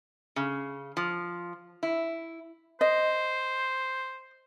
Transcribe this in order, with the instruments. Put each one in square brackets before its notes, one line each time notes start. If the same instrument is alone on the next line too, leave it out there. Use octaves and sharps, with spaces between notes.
[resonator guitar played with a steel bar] C#3
F3
E4
[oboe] C5 [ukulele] D#5